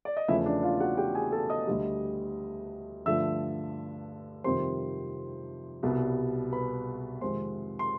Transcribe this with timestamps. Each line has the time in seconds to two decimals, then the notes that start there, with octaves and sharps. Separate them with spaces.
0.05 D5
0.17 D#5
0.28 E2 C#3 F3 A3 E4 E5
0.46 D4 D5
0.63 F4 F5
0.80 F#4 F#5
0.97 G4 G5
1.15 G#4 G#5
1.32 A4 A5
1.50 D#5 D#6
1.67 D2 D3 G3
3.06 G2 D3 F3 A3 E5 E6
4.44 F2 C3 D#3 G3 C5 C6
5.83 C2 B2 G3
6.52 B4 B5
7.21 F2 C3 D#3 G#3 C5 C6
7.79 C6